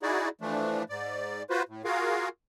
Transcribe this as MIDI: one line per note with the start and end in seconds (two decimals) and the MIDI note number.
0.03 0.29 63
0.03 0.29 64
0.03 0.29 66
0.03 0.29 68
0.03 0.29 74
0.41 0.83 52
0.41 0.83 53
0.41 0.83 57
0.41 0.83 62
0.89 1.43 44
0.89 1.43 74
1.50 1.63 65
1.50 1.63 66
1.50 1.63 71
1.50 1.63 72
1.69 1.82 45
1.85 2.28 65
1.85 2.28 66
1.85 2.28 68
1.85 2.28 70
1.85 2.28 77